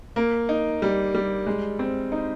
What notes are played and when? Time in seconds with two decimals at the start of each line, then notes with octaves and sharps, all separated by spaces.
0.16 A#3
0.49 D#4
0.82 G3
1.14 G3
1.47 G#3
1.79 C4
2.12 D#4